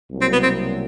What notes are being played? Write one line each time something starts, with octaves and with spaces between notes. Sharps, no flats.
C2 B2 F#3 A#3
C4
B3
C4